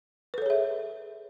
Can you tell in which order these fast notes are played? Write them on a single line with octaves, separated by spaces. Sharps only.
B4 A4 C#5 G#4 E5